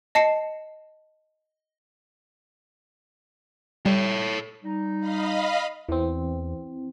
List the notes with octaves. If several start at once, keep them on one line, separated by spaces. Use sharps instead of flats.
D#5 A5 C7 C#7
G3 A4 C#5
G3 D#4
D#5 F5 B5
E2 E3 C4